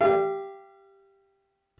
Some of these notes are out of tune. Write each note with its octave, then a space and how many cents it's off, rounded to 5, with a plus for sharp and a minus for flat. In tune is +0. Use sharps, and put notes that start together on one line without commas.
G4 +0 F5 -40